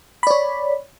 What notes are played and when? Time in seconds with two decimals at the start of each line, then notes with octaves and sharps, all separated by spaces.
0.23 B5
0.27 D5
0.31 C#5